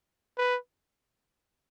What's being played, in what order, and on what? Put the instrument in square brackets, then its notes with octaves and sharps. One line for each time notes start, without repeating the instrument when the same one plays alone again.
[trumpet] B4